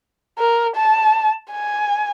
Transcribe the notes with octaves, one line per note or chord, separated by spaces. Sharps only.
A#4
A5
G#5